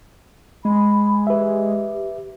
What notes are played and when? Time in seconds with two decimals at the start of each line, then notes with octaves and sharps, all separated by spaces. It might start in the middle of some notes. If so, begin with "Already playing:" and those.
0.65 G#3 B5
1.27 G4 B4 E5